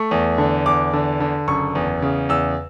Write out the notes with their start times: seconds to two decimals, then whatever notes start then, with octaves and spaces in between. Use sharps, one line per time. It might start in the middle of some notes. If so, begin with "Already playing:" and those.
Already playing: A3 C#6
0.11 E2
0.38 D3
0.66 E2 D6
0.93 D3
1.20 D3
1.48 F#1 C#6
1.75 E2
2.02 C#3
2.29 E2 E6